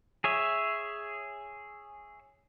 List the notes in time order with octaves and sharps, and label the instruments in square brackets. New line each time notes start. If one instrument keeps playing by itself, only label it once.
[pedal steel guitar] G#4 C#5 E5